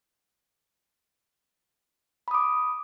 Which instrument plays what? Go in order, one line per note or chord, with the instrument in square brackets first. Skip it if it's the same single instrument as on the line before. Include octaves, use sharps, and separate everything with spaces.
[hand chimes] B5
D#6
D6